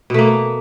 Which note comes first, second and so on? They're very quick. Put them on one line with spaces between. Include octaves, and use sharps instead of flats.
B2 A3 A#3